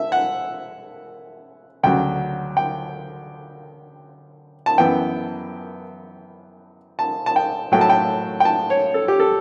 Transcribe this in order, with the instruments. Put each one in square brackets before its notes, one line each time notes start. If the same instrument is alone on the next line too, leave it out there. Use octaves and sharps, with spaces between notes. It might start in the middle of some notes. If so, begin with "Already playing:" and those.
Already playing: [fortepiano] E5
F#5
D2 C#3 F#3 G5
G5
A5
F#2 E3 B3 G5
A5
A5
G5
A2 F#3 A3 G5
A5
G5
G5
A5
C#5
A4
G4
A4